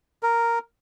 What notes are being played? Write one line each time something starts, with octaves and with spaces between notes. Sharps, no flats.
A#4